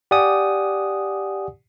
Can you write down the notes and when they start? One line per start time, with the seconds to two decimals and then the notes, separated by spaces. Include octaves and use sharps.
0.11 G4 D5 F#5 G#5 D#6